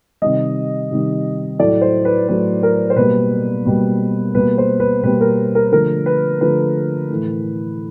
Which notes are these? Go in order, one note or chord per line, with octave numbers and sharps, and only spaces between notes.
C3 D#3 G3 D#5
C3 D#3 G3
A2 F#3 A3 D5
C5
B4
A2 F#3 A3 B4
A#4
C5
B2 G3 A#3 B4
B2 G3 A#3
B2 G3 A#3 B4
C5
B4
B2 G3 A#3 B4
A#4
A#4
D3 F3 A3 A#4
B4
D3 F3 A3 B4
A2 E3 A3